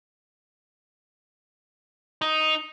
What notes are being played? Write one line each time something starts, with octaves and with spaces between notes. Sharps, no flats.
D#4